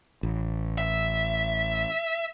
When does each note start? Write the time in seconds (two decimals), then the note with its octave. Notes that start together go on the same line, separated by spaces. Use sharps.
0.23 A1
0.78 E5